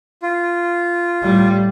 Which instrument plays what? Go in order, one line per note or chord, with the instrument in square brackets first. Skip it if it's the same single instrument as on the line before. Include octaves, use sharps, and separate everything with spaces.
[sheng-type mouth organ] F4
[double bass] A2 G3